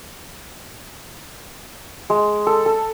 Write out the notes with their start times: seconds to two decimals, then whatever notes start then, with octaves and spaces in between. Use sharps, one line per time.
2.10 G#3
2.47 A4
2.66 A4